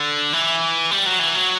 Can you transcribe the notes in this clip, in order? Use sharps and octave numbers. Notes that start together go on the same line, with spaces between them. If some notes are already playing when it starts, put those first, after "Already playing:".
Already playing: D3
E3
G3
F#3
E3
F#3